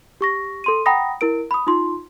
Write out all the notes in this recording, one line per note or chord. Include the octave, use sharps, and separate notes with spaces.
G4 C#6 A#6
A4 C6 D#7
F#5 G5 A#5 B5 D#6 A#6
E4 A#4 D7
B5 D#6
D#4 F4 C6